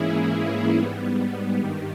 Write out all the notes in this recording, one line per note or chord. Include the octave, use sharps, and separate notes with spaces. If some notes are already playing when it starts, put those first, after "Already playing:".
Already playing: G#2 E3 A#3 C#4 E4 G#4
G#2 G3 B3
G2 D#3 G3